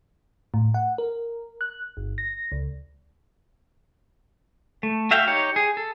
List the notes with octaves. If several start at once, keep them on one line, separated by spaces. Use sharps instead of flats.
A2
F#5
A#4
F#6
G1
A#6
C#2
A3
F#4 E5 F5 G5
D#4 G4 C#5
G#4
A4